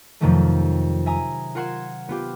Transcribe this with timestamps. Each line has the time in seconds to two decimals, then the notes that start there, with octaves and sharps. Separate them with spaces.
0.21 F2 C3 D#3 F3 F#3 A3
1.06 E5 G#5 A#5 D#6
1.55 F4 A#4 F#5 C6 G#6 E7
2.09 B3 F4 G4